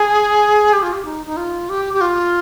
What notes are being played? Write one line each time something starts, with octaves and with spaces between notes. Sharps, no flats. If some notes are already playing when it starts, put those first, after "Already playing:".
Already playing: G#4
G4
F4
G4
D#4
D#4
F4
G4
G4
F4